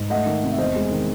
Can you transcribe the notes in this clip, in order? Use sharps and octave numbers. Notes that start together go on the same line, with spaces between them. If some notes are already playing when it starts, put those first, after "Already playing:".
Already playing: G#2
A3 D#5 F#5
D#3
C3
E5
E2 C5 D#5
G#3
D#3